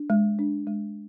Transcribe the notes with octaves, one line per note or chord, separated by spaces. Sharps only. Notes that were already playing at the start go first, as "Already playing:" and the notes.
Already playing: D4
G#3
D4
G#3